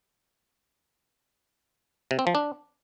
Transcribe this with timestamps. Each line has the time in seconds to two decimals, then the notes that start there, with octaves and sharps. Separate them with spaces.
2.11 C3
2.19 C4
2.27 F3
2.35 D4